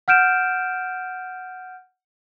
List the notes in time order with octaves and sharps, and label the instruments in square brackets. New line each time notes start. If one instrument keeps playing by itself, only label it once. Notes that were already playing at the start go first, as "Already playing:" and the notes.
[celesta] F#5 F6 G6 D7 E7